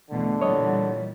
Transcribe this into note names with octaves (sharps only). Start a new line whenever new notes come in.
E2 B2 D3 A3
A#2 E3 G3 C#5 D#5